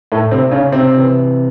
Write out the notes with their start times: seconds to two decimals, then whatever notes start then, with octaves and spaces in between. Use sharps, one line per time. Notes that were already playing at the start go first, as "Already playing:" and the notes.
0.12 A2 A3
0.31 C3 C4
0.51 C#3 C#4
0.72 C3 C4
0.93 C3 E3